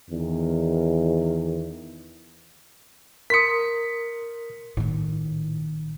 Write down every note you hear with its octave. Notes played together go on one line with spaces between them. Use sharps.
E2 D#3
A#4 C6 D#6 B6 C#7
A#1 A2 D#3